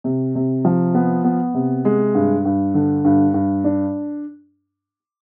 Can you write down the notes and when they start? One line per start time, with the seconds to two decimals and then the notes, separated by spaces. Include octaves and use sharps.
0.04 C3
0.35 C3
0.65 F3
0.94 B3
1.24 B3
1.54 C3
1.85 G#3
2.14 G2
2.45 G2
2.74 D3
3.04 G2
3.34 G2
3.64 D4